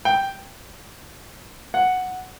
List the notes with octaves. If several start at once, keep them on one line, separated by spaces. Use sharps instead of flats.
G5
F#5